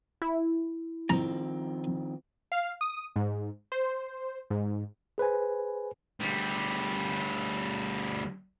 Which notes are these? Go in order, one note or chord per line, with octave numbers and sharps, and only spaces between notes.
E4
D#3 F3 C4 A#5
F5
D#6
G#2
C5
G#2
G#4 B4 C5 G#5
D2 G3